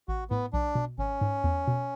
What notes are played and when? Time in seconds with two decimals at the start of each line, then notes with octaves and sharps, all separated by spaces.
0.08 A1 F#4
0.30 A2 B3
0.53 B1 D4
0.75 B2
0.98 G#1 C#4
1.21 G#2
1.44 E2
1.68 B2